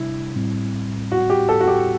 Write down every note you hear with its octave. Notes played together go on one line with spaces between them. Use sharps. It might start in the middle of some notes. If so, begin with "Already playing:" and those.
Already playing: C3 G3 D4 E4
A2 G3 C4
F#4
G4
A4
F#4
G4